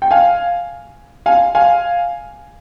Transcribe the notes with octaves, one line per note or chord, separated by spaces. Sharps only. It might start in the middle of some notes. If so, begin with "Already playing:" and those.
G5
F5 G#5
F5 G#5
F5 G#5